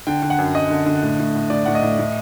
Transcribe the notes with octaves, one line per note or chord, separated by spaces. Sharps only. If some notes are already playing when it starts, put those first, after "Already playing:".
D3 G5
D3
F#5
F#2
F#2 D#5
D3
D3
A2
A2
A2
A2 D5
A2 F#5
D#5
A2
A2